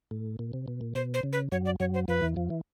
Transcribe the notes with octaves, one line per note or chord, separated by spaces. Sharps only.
A2
A#2
C3
B2
A#2
B2 C5
C5
C#3
B4
F#2 F#3 C#5
D5
F#2 F#3 C#5
C5
F2 F3 B4
E2 E3
F2 F3
E3